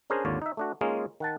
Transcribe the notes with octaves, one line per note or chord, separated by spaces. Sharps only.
C#4 D4 G#4 A#4 C5
G#1 D#2 D3 F4 C#5 D5
D#4 E5
A3 D4 F#4
G#3 A#3 C#4 D#4 F4 G#4
D#3 F#5 A5